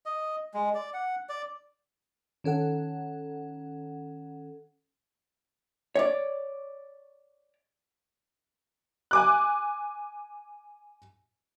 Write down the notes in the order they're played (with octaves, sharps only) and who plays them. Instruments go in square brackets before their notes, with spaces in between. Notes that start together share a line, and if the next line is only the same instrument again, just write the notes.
[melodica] D#5
G#3
D5
F#5
D5
[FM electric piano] D#3 C#4 A4 F#5
[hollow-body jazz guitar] C#5 D5
[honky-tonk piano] G#5 D6 F#6